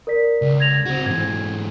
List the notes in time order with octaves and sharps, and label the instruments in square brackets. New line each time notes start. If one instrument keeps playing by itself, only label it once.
[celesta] A#4 D5 B6
[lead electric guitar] C#2
[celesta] G#6 A#6 F7
[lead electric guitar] C4 F#4
[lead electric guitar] G#2 E3 [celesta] G#6